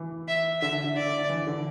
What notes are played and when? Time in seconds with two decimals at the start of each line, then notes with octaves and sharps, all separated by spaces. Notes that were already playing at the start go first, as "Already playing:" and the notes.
Already playing: E3
0.28 E5
0.61 D3 E5
0.84 D3
0.96 D5
1.07 D3
1.29 E3
1.47 D3